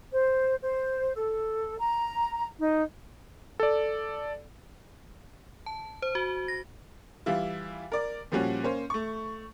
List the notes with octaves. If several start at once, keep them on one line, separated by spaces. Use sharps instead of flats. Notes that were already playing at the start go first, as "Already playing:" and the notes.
C5
C5
A4
A#5
D#4
A4 D5
A5
C5
F#4
A#6
E3 G3 E4 F4
A#4 D5 D6
A#2 F3 G3 C#4 F#4
A#3 C#4 C5
A3 C#6